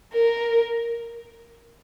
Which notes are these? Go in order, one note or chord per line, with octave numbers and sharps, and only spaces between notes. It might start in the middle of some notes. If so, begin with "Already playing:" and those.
A#4